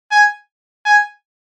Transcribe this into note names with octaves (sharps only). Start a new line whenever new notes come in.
G#5
G#5